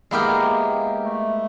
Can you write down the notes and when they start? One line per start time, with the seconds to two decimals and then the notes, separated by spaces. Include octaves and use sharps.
0.11 G#3 A#3 B3 E4 G4 A#4
1.04 A3